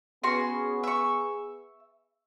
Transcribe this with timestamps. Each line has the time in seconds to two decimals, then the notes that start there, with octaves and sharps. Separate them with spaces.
0.24 B3 C#4 F#4 G#4 C6
0.83 E5 C#6